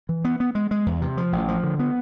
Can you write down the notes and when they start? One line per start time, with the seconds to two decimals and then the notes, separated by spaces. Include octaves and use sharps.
0.09 E3
0.25 B3
0.40 B3
0.55 G#3
0.71 G#3
0.86 E2
1.02 C3
1.17 F3
1.33 A1
1.48 F3
1.63 D3
1.79 B3